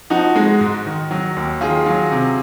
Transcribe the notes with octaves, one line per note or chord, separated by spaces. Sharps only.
F3 D#4 F#4
G#3
G#2
D#3
F#3
D#2
D#3 F4 G#4
F#3
C3